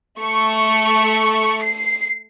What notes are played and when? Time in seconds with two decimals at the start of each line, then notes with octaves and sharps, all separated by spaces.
0.20 A3 C#6
1.62 C7